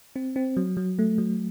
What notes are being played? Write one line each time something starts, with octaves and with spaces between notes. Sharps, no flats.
C4
C4
F#3
F#3
A3
F#3